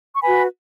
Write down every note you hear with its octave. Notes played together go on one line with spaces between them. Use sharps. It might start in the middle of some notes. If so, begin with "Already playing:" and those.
C#6
F#4 B4 G#5 B5